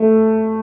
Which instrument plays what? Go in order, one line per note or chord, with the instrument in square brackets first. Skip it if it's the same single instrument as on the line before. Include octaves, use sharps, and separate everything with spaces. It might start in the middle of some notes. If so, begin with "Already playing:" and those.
Already playing: [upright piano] A3